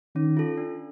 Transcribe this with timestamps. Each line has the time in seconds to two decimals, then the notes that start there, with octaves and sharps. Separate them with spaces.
0.15 D#3 C#4
0.37 F4 A4
0.57 D4